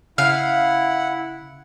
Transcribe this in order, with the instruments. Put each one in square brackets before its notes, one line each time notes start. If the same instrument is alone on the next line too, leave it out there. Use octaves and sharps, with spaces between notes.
[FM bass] C#3 [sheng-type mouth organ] E4 F#5 [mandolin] F5